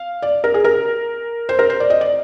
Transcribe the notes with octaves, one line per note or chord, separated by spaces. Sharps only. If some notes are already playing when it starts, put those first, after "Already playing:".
Already playing: F5
D5
A#4
G#4
A#4
C5
A#4
C5
D5
D#5
D5